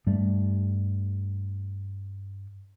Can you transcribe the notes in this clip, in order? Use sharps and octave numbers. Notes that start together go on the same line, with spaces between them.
G2 G3 A3